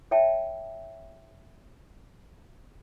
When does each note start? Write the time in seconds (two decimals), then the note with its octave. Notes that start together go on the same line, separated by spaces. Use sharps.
0.11 C#5 E5 G5 A5